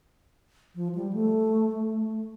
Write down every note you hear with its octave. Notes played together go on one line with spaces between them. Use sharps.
F3
G3
A3